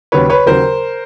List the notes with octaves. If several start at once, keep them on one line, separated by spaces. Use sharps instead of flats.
D#2 C#3 F#3 B4 C#5
B4 C#5
D#2 C#3 F#3 A#4 C5